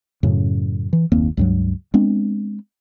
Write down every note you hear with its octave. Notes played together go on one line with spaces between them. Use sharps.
F#2 A2 C#3
E3
F#1 D#2 A#3 C4
C#2 G2 F#3
G#3 B3 C4 D4